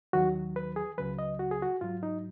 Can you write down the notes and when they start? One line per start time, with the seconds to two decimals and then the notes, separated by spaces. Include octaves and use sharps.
0.13 D#2 D#3 F#3 F#4
0.56 B4
0.76 G#4
0.98 C#2 C#3 F#3 B4
1.19 D#5
1.39 F#4
1.51 G#4
1.62 F#4
1.81 G#2 F#3 F4
2.03 D#4